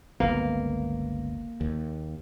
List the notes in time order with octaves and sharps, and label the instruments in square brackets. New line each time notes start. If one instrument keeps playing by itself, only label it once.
[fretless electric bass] G1 C#2 B3 [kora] A#3
[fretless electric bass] D#2